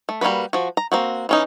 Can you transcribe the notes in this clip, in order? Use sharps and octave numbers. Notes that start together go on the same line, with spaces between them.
A3
G3 A#3 D4 F#4 B4
F3 F#4
A#5
A#3 C4 F#4
E3 C#4 D#4